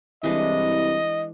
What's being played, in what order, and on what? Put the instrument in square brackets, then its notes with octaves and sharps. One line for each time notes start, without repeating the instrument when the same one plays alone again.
[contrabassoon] C2 [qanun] E3 G#3 D4 [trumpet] D#5